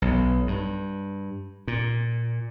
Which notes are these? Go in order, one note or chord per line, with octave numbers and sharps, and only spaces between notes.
B1
G2
A#2